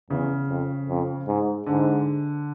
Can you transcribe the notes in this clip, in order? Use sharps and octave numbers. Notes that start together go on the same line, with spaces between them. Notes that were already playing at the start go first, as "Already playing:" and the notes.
E2 C#3
F2
F2
G#2
G#2 D3